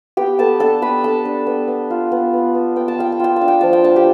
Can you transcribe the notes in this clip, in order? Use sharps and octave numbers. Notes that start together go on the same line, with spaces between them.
B3 G4 G5
B3 A4 A5
D4 A4 A5
B3 B4 B5
D4 A4 A5
D4
B3
B3
F4
B3
B3
B3
B3 G5
A5
F4 G5
A5
F4 G5
A5
D4
G5
F3 A5
G5
D4 A5
G4 G5